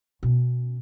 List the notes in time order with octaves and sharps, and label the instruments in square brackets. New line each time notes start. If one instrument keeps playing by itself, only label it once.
[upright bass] B2 C#4